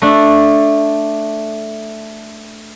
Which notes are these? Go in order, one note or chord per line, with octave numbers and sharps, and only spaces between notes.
A3 D4